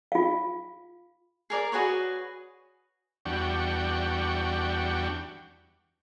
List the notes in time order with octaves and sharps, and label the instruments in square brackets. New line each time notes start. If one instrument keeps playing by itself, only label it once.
[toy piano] F4 F5
[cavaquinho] G#4 A#4 D5
F#4 G#4 B4 C#5
[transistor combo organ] E2 G3 D4 F#4 G5 C#6